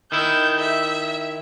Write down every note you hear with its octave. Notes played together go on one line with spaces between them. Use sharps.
D#3 E4 G6
E5